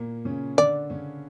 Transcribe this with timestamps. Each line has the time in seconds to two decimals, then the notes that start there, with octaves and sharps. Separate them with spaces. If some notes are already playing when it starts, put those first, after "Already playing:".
Already playing: A#2 A#3
0.25 C#3 C#4
0.57 D3 D4 D5
0.90 C#3 C#4